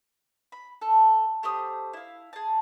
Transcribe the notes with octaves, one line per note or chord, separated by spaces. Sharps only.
B5
A4
A3 G4 C5 D#6
E4 F5
G#4 A5